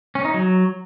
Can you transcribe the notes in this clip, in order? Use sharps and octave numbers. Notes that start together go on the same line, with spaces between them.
C#4
D#4
F#3